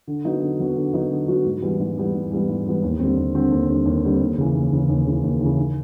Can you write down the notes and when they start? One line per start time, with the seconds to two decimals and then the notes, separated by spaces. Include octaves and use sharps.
0.07 D3
0.24 F#3 B3 D#4 F#4
0.42 D3
0.59 F#3 B3 D#4 F#4
0.76 D3
0.94 F#3 B3 D#4 F#4
1.10 D3
1.28 F#3 B3 D#4 F#4
1.45 G#2
1.62 E3 G3 B3
1.80 G#2
1.97 E3 G3 B3
2.14 G#2
2.31 E3 G3 B3
2.48 G#2
2.65 E3 G3 B3
2.83 D#2
2.99 D3 G3 C4
3.17 D#2
3.34 D3 G3 C4
3.51 D#2
3.69 D3 G3 C4
3.85 D#2
4.03 D3 G3 C4
4.21 D#2
4.38 C#3 E3
4.55 D#2
4.71 C#3 E3
4.89 D#2
5.06 C#3 E3
5.23 D#2
5.41 C#3 E3
5.58 D#3